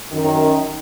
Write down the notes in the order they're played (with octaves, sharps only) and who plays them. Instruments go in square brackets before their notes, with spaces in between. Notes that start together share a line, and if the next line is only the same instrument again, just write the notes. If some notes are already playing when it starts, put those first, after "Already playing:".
[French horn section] F#2 D#3